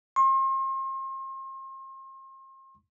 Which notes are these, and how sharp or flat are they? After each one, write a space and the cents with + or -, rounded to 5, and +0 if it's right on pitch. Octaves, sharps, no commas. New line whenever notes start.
C6 +40